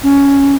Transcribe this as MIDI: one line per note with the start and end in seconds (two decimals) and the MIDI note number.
0.03 0.55 61